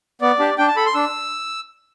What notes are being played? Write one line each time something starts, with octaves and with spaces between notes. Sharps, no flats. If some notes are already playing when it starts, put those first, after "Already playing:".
B3 D5
D4 G4
D4 G5
A5
A4 B5
C6
D4 E6